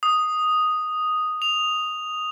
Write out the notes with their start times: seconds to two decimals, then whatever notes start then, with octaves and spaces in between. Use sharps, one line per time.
0.03 D#6
1.42 F7